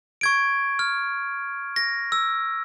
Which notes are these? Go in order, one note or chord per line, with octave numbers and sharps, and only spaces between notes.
C#6 G#6 D7
F6
A#6
E6